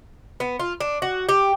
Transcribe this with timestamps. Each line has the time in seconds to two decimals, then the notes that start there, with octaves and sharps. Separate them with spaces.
0.40 B3
0.60 F4
0.80 D4
1.02 F#4
1.29 G4